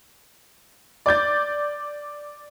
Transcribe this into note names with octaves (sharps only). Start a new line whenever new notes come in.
D5 D6 G6 A6